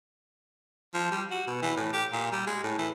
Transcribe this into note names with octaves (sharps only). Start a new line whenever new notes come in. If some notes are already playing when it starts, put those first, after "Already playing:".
F3
G3
F#4
B2
E3
A2
G4
A#2
G3
G#3
A2
E3